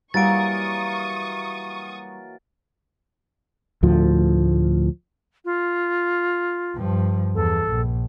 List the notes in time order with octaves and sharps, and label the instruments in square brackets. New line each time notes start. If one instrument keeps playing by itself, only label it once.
[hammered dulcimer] E3 F#3 A#3 [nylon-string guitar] G3 [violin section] C#6 D#6 [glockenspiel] A6 D7
[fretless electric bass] D2 A2 F3
[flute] F4
[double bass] G2 F3
[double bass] E2 [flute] A4
[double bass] A#1